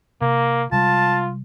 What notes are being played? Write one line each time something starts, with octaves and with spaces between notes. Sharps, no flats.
C3 A#3
C3 G3 G#3 F4 A5